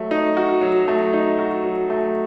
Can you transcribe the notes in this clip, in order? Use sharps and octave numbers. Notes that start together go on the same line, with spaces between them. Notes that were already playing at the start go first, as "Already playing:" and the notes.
Already playing: F#3 A3 F#4
D#4
F#4
F#3
A3
D#4
F#4
F#3
A3